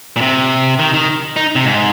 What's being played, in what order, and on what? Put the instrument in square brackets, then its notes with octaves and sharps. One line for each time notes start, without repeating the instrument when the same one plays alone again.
[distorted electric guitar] A#2
C3
D#3
D#3
D#4
C3
G#2